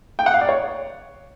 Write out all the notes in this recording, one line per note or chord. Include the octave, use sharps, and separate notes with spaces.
G5
F#5
F5
D5
C#5